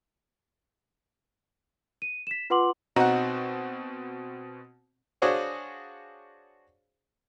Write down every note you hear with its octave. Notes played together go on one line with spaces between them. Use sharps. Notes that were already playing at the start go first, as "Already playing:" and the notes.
D#7
B6 E7
F4 B4 F#5 C6 D6 F#7
B2 C4 D#4 F#4 C#5 F#5
D4 F#4 G#4 C5 C#5 F5